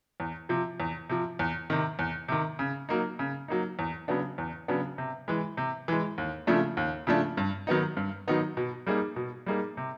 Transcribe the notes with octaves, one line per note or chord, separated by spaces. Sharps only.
E2
C3 F3
E2
C3 F3
E2
C3 D#3
E2
C3 D#3
C#3
F#3 A#3 D#4
C#3
F#3 A#3 D#4
E2
C#3 F#3 B3 D4
E2
C#3 F#3 B3 D4
C3
E3 G#3
C3
E3 G#3
D#2
C#3 F3 A3 D4
D#2
C#3 F3 A3 D4
G2
D#3 F#3 B3 D#4
G2
D#3 F#3 B3 D#4
B2
G3 A#3 D#4 G#4
B2
G3 A#3 D#4 G#4
C3